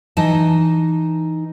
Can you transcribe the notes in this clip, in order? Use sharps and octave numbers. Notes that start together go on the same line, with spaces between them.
E3 D#4 D#5 A5